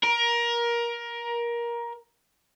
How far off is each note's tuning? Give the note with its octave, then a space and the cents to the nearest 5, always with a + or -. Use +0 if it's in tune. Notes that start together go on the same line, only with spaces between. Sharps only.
A#4 +20